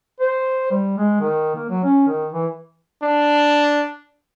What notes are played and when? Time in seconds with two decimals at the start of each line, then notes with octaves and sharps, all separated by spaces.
0.20 C5
0.71 G3
0.98 G#3
1.21 D#3
1.56 A#3
1.70 F#3
1.84 C#4
2.07 D#3
2.33 E3
3.03 D4